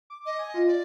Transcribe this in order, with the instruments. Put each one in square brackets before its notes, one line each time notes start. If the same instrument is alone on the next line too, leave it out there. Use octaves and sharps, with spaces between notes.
[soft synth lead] D6
[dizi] D#5
[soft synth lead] G#5
F4
[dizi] D5